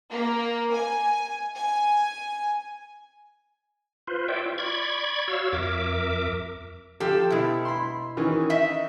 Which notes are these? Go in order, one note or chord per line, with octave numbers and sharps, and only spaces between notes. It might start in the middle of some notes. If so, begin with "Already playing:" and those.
A#3
G#5
G#5
F4 B4 C5
C#5 D5 E5 G5
F4
D5 B5 C#6 G#6
F#4 C#5 F5 E6
F2 A#4 E5 D6
F3 G4 A4 G5
B2 E4
B5 C6
D#3 E3 C#4
D#5 E5